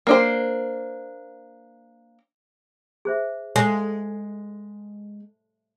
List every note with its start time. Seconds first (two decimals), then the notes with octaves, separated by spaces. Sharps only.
0.07 A#3 D4 C5
3.05 G#4 C5 E5
3.56 G#3 A4